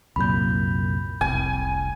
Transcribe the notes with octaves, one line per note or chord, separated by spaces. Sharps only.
C2 F#2 A#2 B5 G6
F1 C2 G#5